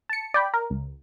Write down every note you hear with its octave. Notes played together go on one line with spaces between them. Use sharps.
A5 C#7
D5 G5 B5
A#4
C#2